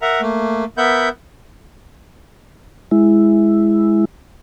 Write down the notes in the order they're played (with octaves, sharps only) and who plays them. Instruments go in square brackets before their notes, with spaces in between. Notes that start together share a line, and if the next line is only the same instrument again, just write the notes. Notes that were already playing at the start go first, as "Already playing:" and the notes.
[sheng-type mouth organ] A#4 E5 F#5 A#5
A3 A#3
B3 A#4 E5 F#5 B5 G6
[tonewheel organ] G#3 E4